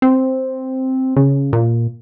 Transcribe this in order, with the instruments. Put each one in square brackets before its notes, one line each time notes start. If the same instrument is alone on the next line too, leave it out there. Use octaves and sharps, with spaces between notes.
[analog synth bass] C4
C#3
A#2